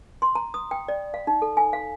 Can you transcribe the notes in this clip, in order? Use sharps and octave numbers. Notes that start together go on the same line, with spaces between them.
C6
A#5
D#6
G5
D5
F5
D#4
A4
G#5
F5